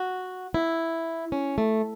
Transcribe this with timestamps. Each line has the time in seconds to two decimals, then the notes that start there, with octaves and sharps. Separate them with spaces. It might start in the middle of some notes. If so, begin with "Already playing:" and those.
Already playing: F#4
0.54 E4
1.32 C#4
1.58 A3